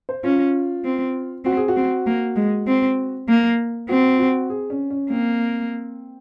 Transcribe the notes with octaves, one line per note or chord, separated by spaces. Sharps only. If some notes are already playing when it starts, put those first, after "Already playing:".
C5
C#4 F4
C4
C4 F#4
G#4
F#4
C4
A#3
G#3
C4
A#3
C4 F#4
F#4
G#4
C#4
C#4
A#3 C4